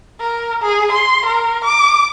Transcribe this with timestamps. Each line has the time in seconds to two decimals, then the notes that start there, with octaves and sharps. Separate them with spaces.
0.20 A#4
0.62 G#4
0.92 C6
1.26 A#4
1.64 D6